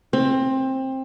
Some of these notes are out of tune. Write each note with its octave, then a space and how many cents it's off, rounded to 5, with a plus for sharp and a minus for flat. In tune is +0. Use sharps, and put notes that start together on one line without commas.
C4 +20